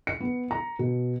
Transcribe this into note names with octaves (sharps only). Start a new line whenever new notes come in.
C#7
B3
A#5
B2